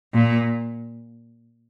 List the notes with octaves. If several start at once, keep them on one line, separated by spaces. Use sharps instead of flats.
A#2